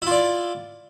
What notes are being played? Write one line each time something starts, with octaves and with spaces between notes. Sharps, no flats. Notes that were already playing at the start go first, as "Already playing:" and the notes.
E4 F4 D5